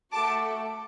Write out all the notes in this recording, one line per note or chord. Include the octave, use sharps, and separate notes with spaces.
A3 F#4 A4 A5 D6